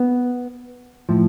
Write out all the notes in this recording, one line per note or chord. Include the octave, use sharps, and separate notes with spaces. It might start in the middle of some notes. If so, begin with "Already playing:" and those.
Already playing: B3
A2 F3